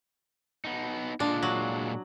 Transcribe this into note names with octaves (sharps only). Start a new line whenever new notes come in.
B3 D#4
A#2 G#3 D4 F4
F#3